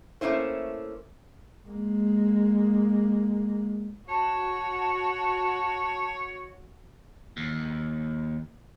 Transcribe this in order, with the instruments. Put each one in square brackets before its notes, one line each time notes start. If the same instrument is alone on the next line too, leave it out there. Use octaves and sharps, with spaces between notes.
[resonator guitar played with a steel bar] A3 A#3 C#4 E4 C5
[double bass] G#3 A#3
[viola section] F#4 [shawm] C#5 [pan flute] A5
[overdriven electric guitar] D#2